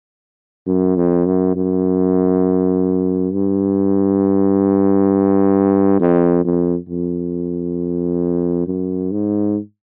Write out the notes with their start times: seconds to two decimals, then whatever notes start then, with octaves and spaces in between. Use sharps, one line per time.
0.67 F#2
0.96 F2
1.26 F#2
1.55 F#2
3.33 G2
6.00 F2
6.44 F2
6.89 F2
8.67 F#2
9.11 G#2